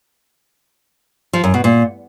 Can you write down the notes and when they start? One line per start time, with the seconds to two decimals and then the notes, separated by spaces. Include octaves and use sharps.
1.33 F3
1.44 F#2
1.54 B2
1.64 A#2